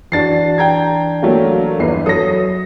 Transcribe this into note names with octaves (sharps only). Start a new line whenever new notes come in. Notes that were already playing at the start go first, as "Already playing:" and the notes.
E3 D4 F#4 A6 C7
G5 A#5 G#6
F#3 A3 A#3
G1 E2 B4 C7
F#3 A4 D#6 A#6